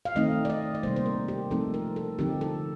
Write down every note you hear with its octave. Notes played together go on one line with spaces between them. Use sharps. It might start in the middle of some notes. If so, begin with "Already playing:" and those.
F5
D#3 A3 C4 D#4 D#5
D5
D#5
D5
C3 G3 A#3 C5
C5
A#4
G4
F3 A3 C4 D#4 A4
A#4
A4
D3 F3 C4 D#4 G4
A4